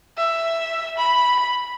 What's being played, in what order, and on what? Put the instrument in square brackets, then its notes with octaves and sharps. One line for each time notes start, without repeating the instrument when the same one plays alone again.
[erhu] E5
B5